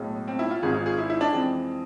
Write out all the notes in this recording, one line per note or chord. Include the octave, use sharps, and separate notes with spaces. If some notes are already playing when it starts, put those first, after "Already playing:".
Already playing: B1 A2 G#3
C4
E4
F4
G#1 G#2 G#3 G#4
F4
G#4
E4
E4
D4
F2 E3 G#3 C4